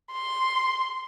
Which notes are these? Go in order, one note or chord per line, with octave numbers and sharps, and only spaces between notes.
C6